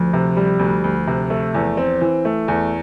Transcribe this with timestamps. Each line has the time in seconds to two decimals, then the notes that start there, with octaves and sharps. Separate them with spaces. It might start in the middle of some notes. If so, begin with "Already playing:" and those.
Already playing: D2 F3
0.13 C3
0.37 G3
0.59 D2
0.84 D2
1.07 C3
1.30 A3
1.54 E2
1.77 C4
2.01 E3
2.25 A3
2.48 E2